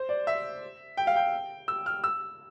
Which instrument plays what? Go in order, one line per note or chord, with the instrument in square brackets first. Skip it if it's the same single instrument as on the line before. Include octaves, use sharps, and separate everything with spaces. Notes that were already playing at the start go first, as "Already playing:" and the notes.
Already playing: [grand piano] C5
D5
E5
G5
F5
G5
E6
F6
E6